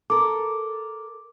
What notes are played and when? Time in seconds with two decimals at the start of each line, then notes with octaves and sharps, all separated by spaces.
0.10 A4 A#4 D6